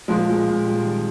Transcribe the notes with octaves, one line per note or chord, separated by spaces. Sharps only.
A#2 F3 G#3
A#2
A#2
G3
D#3